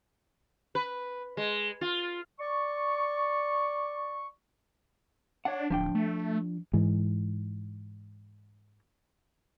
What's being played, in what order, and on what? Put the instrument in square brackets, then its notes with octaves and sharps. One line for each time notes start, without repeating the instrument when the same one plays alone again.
[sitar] B4
G#3
F4
[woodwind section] D5 C#6
[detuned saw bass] D4 [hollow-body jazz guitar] C#5 F#5
[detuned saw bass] D1 [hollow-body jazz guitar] F3 D4 G5
[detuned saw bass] A3
[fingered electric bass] G#2 E3